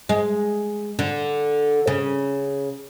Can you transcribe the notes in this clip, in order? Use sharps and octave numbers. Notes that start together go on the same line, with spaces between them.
G#3
D3
C#3